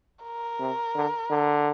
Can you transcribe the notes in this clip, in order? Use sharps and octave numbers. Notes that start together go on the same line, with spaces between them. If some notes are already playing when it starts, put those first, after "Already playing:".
A#4
C3
D3
D3